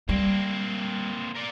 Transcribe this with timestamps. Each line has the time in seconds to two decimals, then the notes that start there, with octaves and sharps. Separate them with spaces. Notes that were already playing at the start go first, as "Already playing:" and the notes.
0.09 G3 A#3 C4
1.35 A#4 D5